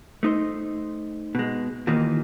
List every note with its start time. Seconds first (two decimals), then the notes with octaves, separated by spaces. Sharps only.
0.23 A3 D#4 C5
1.35 B2 G#3
1.87 D#2 A#2 D#3 E3 A#3 D#4